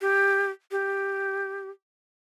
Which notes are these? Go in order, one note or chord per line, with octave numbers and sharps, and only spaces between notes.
G4
G4